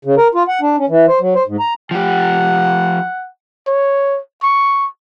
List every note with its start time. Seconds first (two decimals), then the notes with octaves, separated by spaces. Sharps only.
0.05 C#3
0.17 A#4
0.35 F4
0.48 F#5
0.61 D4
0.78 C#4
0.89 E3
1.08 C5
1.20 F#3
1.35 C5
1.47 G#2
1.59 A#5
1.91 F3 G4 F#5
3.67 C#5
4.43 C#6